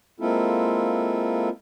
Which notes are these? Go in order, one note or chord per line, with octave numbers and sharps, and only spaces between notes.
G#3 A#3 C4 E4 F4 A4